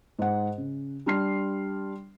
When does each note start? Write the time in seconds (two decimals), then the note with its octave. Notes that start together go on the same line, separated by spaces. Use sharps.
0.19 G#2 F#5
0.58 C#3
1.06 G3 D4 C6 F6 C7